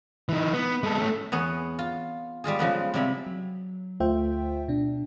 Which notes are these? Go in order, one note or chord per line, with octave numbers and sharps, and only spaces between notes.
E3 D#4
B3
G#3 A4
A3 C#4
E2 B3 G#4 C#5
F4
G3 G#3 F4 G#4
C#3 F3 G#3 B3
C3 F3 G3 E4 A#5 B5
F#3
D2 A3 F4 C5 E5 G5
B2 D4